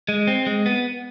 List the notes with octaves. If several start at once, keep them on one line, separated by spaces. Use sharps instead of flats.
G#3
C4
G#3
B3